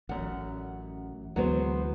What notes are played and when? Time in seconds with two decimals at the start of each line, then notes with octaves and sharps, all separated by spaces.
0.09 A1 F#2 F#5
1.36 D2 E3 F#3 G#3 B3 C5